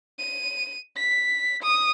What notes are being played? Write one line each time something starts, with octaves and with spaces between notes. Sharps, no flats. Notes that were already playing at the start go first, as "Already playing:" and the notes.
D#7
B6
D#6